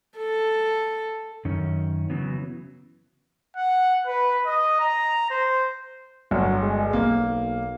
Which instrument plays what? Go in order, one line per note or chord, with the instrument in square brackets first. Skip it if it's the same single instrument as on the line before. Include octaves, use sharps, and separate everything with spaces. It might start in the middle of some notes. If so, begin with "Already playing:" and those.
[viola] A4
[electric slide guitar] F#2 D#3 C#4
C#3 E3 F#3 B3
[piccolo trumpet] F#5
B4
D#5
A#5
C5
[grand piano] G1 [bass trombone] F#3
[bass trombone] G#3
[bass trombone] B1 [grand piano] A#3